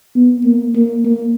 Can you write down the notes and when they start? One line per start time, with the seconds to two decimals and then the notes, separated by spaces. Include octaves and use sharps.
0.16 B3
0.45 A#3
0.75 A#3
1.05 A#3